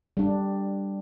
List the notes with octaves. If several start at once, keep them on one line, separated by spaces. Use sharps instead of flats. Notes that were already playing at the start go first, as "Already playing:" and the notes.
G3 D4